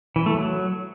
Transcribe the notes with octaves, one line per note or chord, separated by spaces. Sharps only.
E3
A3
F#3